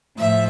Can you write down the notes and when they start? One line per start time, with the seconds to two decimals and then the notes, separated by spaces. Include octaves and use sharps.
0.17 A2 F3 E5